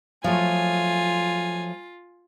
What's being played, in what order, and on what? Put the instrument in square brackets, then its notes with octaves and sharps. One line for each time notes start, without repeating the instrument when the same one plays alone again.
[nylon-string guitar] F3 F#3 A3 [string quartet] F4 [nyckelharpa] G#5